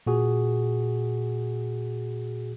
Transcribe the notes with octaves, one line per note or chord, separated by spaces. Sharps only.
A#2 F#4 G#4